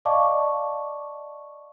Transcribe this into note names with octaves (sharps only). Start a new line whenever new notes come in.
D5 D#5 F5 A5 C#6 D6